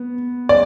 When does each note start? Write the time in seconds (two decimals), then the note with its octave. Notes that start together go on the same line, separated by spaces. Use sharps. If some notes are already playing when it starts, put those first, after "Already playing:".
Already playing: B3
0.49 D5